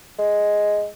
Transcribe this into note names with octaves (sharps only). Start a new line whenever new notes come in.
G#3